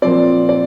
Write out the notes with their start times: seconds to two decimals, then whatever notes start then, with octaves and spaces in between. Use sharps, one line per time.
0.02 A#2 F3 C4 D5
0.49 D5